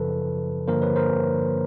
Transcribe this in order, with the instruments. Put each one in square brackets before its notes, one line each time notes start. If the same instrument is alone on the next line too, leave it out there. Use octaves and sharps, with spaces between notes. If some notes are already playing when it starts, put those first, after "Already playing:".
Already playing: [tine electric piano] F#2 C#3 F3 A4 B4
G2 D3 F3 A#3 A#4 C5
B4 C#5
A#4 C5